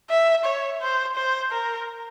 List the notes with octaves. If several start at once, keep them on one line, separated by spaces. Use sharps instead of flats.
E5
C#5
C5
C5
A#4